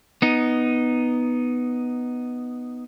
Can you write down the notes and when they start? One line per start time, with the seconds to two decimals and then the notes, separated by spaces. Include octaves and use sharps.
0.22 B3 D#4